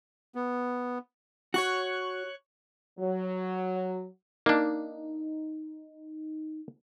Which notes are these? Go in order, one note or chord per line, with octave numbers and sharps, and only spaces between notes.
B3
F#4 C#5 C#6 F#6
F#3
A#3 D4 D#4